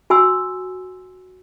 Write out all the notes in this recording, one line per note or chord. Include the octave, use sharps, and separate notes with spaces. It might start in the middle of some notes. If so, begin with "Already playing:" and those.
F#4 G#5 C6 E6